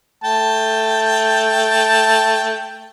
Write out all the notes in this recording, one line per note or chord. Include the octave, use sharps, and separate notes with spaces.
A3 G5 A5